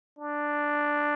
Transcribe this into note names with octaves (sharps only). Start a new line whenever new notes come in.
D4